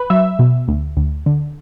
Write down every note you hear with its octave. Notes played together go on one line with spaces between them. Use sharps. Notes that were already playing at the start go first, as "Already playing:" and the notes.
Already playing: B4
F#3 E5
B2
D2
D2
D3